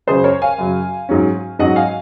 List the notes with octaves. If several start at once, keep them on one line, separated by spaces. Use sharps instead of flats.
F#2 C#3 F#3 G#4 C5
A#4 C#5
F5 G#5
F#2 C#3 F#3
G#2 F#3 C#4
G#2 F#3 C#4 D#5 F#5
F5 G#5